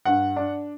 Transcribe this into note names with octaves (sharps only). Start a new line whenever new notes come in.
G2 F#5
D4